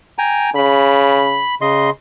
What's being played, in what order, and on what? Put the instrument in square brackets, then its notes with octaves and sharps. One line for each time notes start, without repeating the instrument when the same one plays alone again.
[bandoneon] G5 G#5 A#5
[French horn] C#3 [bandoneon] B5
[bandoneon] C#3 D#5 C6